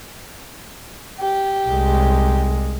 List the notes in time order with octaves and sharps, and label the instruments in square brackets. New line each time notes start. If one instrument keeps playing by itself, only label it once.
[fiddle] G4
[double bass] C2 G#3